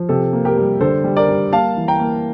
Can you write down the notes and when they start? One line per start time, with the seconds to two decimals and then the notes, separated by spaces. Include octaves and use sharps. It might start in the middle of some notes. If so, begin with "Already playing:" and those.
Already playing: F3
0.09 C3 A4
0.33 A#3
0.45 G4 A#4
0.57 G3
0.81 D3 A4 C5
1.04 G3
1.17 A#4 D5
1.29 G3
1.53 A#3 F5 A5
1.76 E3
1.88 G5 A#5
2.00 A#3